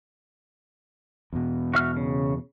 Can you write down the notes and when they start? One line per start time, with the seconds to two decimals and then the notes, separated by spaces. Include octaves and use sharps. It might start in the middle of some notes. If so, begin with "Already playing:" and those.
1.33 E2 B2
1.74 F#4 E5 F6
1.97 C#3